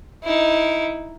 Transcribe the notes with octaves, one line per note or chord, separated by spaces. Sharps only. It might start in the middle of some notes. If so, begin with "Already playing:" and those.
D#4 E4